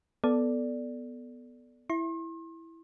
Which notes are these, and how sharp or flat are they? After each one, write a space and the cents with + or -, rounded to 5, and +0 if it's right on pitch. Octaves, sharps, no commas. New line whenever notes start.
B3 +0 A4 +0 D5 +0
E4 +0 C6 +40